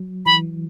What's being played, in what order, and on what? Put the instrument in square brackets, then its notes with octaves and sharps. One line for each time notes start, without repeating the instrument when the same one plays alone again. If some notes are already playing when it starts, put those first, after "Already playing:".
Already playing: [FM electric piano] F#3
[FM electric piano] E3 [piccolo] B5